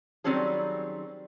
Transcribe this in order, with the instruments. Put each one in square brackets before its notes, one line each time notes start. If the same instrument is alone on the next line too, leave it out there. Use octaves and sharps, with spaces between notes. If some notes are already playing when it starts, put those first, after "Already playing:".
[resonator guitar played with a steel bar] D#3 F#3 G3 C4 C#4 G#4